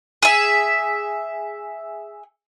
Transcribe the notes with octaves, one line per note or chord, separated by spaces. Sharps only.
G#4 E5